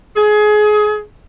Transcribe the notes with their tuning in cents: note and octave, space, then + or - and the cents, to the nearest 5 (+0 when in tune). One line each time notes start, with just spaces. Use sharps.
G#4 +25